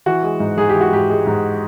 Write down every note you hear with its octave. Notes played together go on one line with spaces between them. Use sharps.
E3 F#4
G#3
G#2
G#2 G#4
G4
E3
F#4
G#2 G4
G#3
G#2